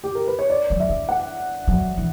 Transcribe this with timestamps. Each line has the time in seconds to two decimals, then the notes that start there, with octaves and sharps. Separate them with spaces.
0.04 G4
0.15 A#4
0.27 B4
0.39 C#5
0.50 D5
0.70 F#3
0.80 E5
0.89 B3
1.09 F#5
1.67 F#3
1.97 E3